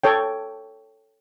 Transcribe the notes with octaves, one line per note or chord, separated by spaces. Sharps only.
A4 C#5 G5